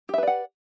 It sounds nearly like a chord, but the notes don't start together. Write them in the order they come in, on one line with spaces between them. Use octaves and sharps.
G4 E5 B4 D5 F#5